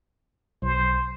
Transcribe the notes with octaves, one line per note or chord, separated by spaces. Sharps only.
B1 C5